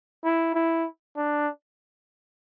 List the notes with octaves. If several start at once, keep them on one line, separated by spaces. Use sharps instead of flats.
E4
E4
D4